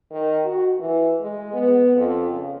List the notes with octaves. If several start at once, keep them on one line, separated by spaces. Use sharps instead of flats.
D#3
F#4
E3
G#3
B3
F2
C#3